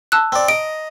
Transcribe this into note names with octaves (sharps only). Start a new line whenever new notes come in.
A5 E6 F#6
C4 D5
D#5 A#5 D7